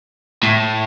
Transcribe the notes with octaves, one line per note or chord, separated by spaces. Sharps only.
A2